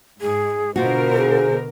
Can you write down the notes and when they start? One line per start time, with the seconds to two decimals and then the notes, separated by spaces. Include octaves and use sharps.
0.21 G#2 G#4
0.76 B2 D3 F4 F#4 A#4 C5
1.17 G#4